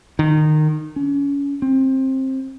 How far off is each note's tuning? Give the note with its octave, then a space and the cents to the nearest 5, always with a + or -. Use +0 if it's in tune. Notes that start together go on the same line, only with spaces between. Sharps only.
D#3 -20
C#4 +30
C4 +20